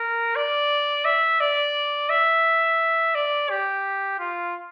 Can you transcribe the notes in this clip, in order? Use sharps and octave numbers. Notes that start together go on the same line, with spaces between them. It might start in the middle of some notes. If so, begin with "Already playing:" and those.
Already playing: A#4
D5
E5
D5
E5
D5
G4
F4